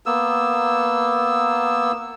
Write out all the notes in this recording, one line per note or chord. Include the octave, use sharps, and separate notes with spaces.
A#3 B3 E6